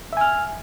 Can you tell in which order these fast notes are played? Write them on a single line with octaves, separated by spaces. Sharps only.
E5 G#5 F6